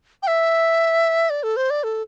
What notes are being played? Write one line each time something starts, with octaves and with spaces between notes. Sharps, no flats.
G5
E5
D5
A4
C5
D5
A4